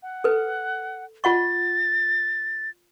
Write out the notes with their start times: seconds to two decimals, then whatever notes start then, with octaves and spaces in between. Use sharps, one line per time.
0.03 F#5
0.24 A4 B4
1.24 F4 F#5 C#6 A6